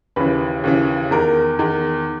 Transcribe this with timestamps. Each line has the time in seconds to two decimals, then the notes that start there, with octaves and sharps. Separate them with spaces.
0.16 D#2 C#3 E3 B4
0.64 D#2 C#3 E3
1.11 E2 D#3 A#4
1.59 E2 D#3